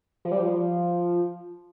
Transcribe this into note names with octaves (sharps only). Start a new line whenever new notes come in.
F3
G3
F3